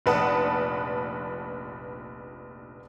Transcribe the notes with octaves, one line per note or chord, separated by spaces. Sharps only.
F1 A#1 B4 F#5 A5 D#6